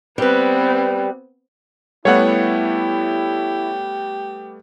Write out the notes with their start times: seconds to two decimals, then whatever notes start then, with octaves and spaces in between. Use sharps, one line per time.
0.18 G3 B3 C4 B4
2.05 G3 A3 B3 E4 G4 C#5 F#5